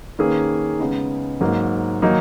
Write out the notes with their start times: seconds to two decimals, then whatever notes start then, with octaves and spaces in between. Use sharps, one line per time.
0.19 D#3 A#3 C#4 G#4 B4
0.79 C#3 G#3 B3 D#4
1.41 G#2 F#3 A#3
2.02 D#3 F#3 A#3 D#4